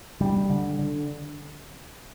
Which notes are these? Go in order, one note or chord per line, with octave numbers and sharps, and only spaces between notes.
D3 G3
D3
D3